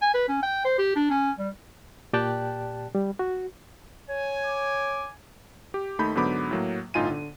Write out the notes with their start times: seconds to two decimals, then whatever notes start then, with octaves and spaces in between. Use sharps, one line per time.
0.02 G#5
0.14 B4
0.29 C#4
0.42 G5
0.65 C5
0.78 G4
0.96 D4
1.10 C#4
1.39 G3
2.13 A#2 G4 D5 G5 A5 F#6
2.95 G3
3.19 F#4
4.09 C#5 G#5
4.46 D6
5.74 G4
5.99 D#2 A3 D#4 B5 G6
6.15 G#2 D3 F#3 B3 B5 D6
6.51 A2 F#3 A#3
6.94 G1 A2 D#4 F4 G#5 D#7
7.10 D3